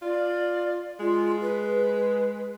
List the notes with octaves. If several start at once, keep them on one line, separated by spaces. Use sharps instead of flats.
F4 D5
G#3 F4
B4